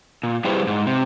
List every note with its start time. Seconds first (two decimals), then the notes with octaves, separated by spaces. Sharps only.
0.23 A#2
0.44 G3 E4 G4 G#4 B4 C5
0.67 G#2
0.87 C3